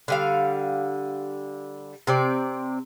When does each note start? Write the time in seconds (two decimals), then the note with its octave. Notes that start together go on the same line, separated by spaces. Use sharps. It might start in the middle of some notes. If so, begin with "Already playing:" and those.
0.08 D3 G3 F5
2.07 C3 C4 D5